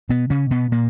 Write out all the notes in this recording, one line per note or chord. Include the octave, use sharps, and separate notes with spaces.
B2 B3
C#3 C#4
B2 B3
A#2 A#3